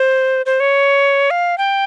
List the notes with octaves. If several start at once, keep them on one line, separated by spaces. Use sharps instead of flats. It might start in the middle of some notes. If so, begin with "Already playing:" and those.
Already playing: C5
C5
C#5
F5
G5